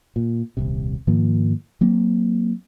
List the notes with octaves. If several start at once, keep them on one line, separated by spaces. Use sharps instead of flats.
A#2
D#1 C2 C3
G#2 D#3 F3 A#3
F#3 A#3 C4